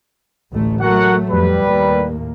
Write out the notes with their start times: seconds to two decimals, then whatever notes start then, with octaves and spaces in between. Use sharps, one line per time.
0.51 A1 D2 A3
0.80 F#3 A3 F#4 A#4 F#5
1.31 F2 G3 B4
1.64 D#2 A2 A#3